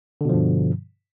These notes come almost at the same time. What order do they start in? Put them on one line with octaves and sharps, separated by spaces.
D3 B2 F3 G2